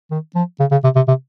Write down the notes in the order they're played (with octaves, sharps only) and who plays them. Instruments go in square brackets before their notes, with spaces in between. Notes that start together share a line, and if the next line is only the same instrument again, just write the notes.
[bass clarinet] D#3
F3
C#3
C#3
C3
C3
C3